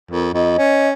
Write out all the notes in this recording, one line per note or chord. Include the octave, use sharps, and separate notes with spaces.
F2 A#4
F2 D#5
C#4